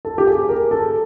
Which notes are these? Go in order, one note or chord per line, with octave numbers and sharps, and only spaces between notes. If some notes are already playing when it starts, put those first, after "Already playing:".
A4
G4
G#4
A#4
A4